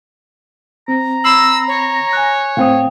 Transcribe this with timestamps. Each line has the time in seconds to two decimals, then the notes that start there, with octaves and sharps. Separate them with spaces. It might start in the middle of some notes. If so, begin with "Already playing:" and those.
0.88 C4 A#5
1.24 B5 E6 C7 F#7
1.68 C#5
2.13 G#5 F#6
2.57 A2 C4 F5 G5 D#6